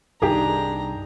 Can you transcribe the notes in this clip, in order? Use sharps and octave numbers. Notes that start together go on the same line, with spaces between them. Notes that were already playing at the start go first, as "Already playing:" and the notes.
C2 G2 D#3 D4 G4 G#4 A#5